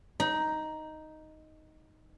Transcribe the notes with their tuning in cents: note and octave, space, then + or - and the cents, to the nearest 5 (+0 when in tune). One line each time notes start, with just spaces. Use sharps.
D#4 +0 B5 -40